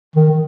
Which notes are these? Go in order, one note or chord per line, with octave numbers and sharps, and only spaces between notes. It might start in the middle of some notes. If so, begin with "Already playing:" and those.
D#3
D#3